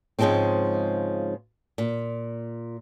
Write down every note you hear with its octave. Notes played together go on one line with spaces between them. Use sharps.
G#2 C#3 E3 F3 G#3 C4
A#2